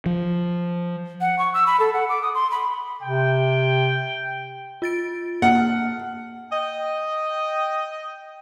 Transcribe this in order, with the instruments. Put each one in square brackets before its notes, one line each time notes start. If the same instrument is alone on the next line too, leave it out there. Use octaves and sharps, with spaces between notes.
[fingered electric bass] F3
[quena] F#5
C#6
E6
B5
A4
F#5
D6
D#6
C6
B5
[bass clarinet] C3 [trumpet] G5
[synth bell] F4 A6 D7
[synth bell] A#3 F6 [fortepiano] F#5
[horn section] D#5 G5